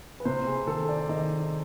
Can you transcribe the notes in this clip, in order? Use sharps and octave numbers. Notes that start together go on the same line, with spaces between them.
B4
C3 C5
G#4
D#3 A4
D5
D#3 D#5